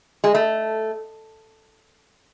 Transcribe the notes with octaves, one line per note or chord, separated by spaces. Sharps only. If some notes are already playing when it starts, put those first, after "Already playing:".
G#3
A3